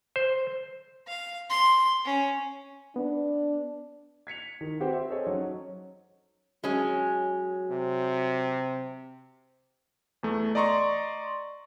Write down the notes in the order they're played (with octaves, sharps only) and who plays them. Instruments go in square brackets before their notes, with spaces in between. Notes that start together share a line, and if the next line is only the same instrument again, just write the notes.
[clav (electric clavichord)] C5
[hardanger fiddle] F5
C6
C#4
[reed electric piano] B3 [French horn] D4
[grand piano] G#6 B6 C#7 F7
D#3
C4 F#4 G4 B4 C5
E5
G#4 A4 C5 C#5 D#5
F#3 C#4 D#4 C#5
[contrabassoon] F#3 [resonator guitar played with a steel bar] G#3 C#4
[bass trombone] C3
[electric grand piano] E2 A3
D5 D#5 A#5 C6 C#6